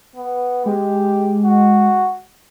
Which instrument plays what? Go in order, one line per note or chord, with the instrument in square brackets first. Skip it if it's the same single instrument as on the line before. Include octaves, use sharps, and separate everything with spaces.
[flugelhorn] B3
[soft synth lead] G#3 [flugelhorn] G4
[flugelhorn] F#4